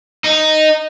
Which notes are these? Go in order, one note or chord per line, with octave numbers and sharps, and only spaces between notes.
D#4